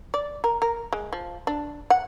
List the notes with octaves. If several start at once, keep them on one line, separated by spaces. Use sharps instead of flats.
D5
A#4
A#4
G#3
F3
D4
F#5